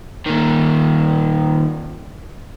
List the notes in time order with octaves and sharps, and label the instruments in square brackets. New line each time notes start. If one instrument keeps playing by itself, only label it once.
[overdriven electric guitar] A#2 D#3